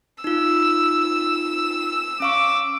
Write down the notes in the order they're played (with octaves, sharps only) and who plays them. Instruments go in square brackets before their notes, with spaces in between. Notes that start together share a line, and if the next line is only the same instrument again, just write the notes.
[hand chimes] D#4 F4 [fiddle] E6
[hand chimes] C#4 F5 C#6 [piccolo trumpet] D6